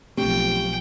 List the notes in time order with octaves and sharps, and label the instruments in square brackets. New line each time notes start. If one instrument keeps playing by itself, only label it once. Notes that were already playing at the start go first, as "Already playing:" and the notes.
[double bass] B1 F3 [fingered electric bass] A3 C4 D4 [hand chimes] G4 [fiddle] G5